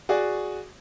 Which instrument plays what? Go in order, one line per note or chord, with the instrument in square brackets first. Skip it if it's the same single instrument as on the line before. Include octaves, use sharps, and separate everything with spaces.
[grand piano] F#4 G#4 D5